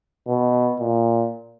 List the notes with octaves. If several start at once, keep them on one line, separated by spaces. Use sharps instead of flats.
B2
A#2